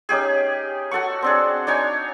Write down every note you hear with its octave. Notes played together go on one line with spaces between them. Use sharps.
C#4 D#4 G4 G#4
F#4 A4 F#5 C#6
C4 D4 G#4
D4 D#4 C#5 G#5